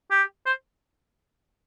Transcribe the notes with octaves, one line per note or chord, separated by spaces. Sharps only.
G4
C5